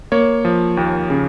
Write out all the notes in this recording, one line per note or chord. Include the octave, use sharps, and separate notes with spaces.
A#3 C#5
F3
D#2
C#3